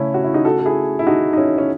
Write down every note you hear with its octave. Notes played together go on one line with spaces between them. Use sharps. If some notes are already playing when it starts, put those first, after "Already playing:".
Already playing: C#3 A3 C#4 E4
F#4
E4
D#4 F#4
F#4 A4
A4
E4 G#4
E4
D#4 F#4
D#4
C#4 E4
C#4